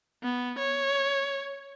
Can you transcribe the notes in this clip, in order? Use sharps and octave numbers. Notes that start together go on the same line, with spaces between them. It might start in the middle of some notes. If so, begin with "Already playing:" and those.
B3
C#5